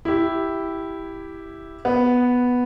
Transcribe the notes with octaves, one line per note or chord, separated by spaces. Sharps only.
E4 G4
B3